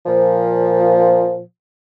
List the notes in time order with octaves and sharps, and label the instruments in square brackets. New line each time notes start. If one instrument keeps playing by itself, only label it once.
[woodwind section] A#2 F3